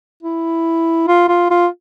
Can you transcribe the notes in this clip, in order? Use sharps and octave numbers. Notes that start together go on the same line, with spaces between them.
E4
F4
F4
F4